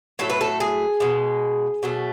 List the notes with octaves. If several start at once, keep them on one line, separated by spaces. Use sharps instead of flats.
A2 F#3 A3 A4
B4
A4
G#4
B2 G#3
B2 F#3 A3